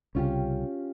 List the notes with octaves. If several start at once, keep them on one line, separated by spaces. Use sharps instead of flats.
C2 C#3 C#4 F4 G4